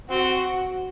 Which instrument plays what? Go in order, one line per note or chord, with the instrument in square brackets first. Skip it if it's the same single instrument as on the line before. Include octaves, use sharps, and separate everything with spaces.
[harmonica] C4 [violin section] F#4